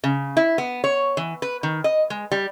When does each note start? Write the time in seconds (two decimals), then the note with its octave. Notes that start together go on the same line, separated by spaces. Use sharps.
0.04 C#3
0.37 E4
0.58 B3
0.84 C#5
1.17 E3
1.42 B4
1.63 D#3
1.84 D#5
2.10 G#3
2.32 G3